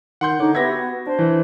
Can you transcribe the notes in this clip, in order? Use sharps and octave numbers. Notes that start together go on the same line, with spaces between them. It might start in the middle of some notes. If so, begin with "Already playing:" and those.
D#3 F#5 C6 G6
D3 D#4 C#5 D6
B3 G4 B4 E5 G#6 A#6
F#4
D4 C5
E3